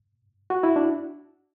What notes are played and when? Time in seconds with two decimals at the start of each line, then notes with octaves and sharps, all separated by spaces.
0.50 F#4
0.63 E4
0.76 D4